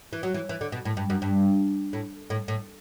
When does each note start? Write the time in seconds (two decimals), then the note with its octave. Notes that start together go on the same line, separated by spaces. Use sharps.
0.13 E3
0.23 F#3
0.34 E3
0.49 E3
0.61 D3
0.72 B2
0.85 A2
0.97 G2
1.10 F#2
1.22 G2
1.93 A2
2.30 A2
2.48 A2